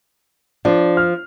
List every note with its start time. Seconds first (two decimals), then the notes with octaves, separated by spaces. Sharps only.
0.65 F3 D4
0.97 F6